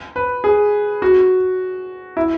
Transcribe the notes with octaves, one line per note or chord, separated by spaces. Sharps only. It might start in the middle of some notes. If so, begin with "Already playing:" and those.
B4
G#4
F#4
E4